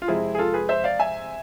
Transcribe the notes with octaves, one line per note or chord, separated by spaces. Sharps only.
F4
F2 C3 G#3 C4 E4 G#4
G#4
F4 A4
G#4 B4
C5 E5
D5 F5
E5 G#5